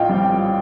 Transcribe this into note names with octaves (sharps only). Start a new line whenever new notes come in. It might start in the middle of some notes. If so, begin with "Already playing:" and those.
Already playing: A#1 A2 D#5 F5 G5
G3
G5